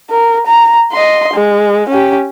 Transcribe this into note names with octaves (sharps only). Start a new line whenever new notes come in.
A#4
A#5
D#5 C6
G#3
C#4 G4